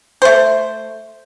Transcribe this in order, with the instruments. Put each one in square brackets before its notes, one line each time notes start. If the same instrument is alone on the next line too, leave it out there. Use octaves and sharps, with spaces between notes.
[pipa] A3 C5